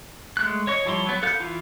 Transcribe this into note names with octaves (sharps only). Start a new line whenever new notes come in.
G#3 A3 F#6
C#5 D#5 C#6
F3 G3 E4 C#5 C6
F#3 B3
B3 A4 F5 F#6 G6
E3 E4 F4